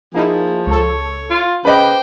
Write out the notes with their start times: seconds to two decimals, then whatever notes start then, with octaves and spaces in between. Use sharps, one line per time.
0.14 F3 A#3 D#4 E4 G#4
0.67 C#2 A4 C#5
1.31 F4
1.65 C#3 B4 C5 D#5 G5 B5 D6